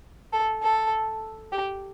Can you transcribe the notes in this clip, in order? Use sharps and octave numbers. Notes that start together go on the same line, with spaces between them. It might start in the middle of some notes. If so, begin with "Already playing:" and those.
A4
A4
G4